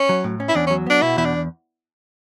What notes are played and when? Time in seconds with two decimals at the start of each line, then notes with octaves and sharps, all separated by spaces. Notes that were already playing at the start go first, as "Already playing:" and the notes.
Already playing: C#4
0.09 F#3
0.24 A2
0.40 C#4
0.49 E4
0.55 E2 D4
0.67 C#4
0.71 F#3
0.86 B3 D4
1.02 B2 E4
1.17 E2 E4
1.25 D4